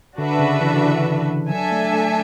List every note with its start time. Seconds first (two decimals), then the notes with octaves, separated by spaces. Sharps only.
0.18 D3 D4 F#4 B4 E5
0.39 C#3
0.61 E3
0.74 D3
0.85 E3
1.49 F#3 D4 A4 E5 G#5
1.72 A3
1.93 A3